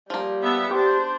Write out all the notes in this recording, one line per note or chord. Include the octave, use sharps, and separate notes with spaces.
F3 G3 A#3
B3 D4 E5
D4 G4 C5